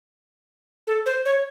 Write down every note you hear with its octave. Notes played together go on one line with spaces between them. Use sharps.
A4
C5
C#5